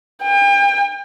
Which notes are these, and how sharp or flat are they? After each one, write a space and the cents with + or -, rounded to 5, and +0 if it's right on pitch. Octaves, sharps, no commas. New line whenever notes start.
G5 +40